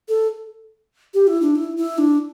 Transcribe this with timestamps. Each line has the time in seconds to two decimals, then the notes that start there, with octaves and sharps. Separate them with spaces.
0.08 A4
1.14 G4
1.27 E4
1.42 D4
1.55 E4
1.77 E4
1.98 D4